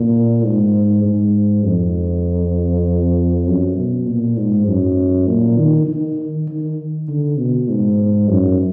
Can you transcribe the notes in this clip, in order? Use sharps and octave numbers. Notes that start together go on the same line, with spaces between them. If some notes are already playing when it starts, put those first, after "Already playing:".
Already playing: A#2
G#2
G#2
F2
F#2
B2
A#2
G#2
F#2
A#2
D#3
D#3
D#3
D3
B2
G#2
F#2